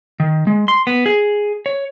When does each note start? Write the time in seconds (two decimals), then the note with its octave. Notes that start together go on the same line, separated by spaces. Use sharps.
0.20 D#3
0.47 G#3
0.68 C6
0.87 B3
1.06 G#4
1.66 C#5